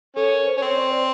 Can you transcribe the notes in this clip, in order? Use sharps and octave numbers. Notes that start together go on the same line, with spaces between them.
C#4 A4
A#4
C5
C#4
C4 C#5
D5
C5